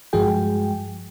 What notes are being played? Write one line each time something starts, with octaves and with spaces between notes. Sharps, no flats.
G2 F3 G#3 F#4 G#4 G5